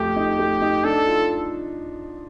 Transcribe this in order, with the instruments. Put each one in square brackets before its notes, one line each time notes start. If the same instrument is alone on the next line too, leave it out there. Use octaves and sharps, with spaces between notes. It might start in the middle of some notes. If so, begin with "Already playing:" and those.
Already playing: [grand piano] F2 A3 [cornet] G4
[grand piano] D#4
A3
D#4
[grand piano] D4 [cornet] A4
[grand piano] F4